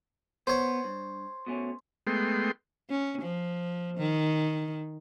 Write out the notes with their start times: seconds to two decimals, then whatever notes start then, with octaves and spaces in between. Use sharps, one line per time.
0.47 B3 C5 C#5 C6
0.84 G2
1.47 B2 A3 C#4
2.07 G#3 A3 B3 G5 C6
2.90 C#4
3.22 F3
3.97 D#3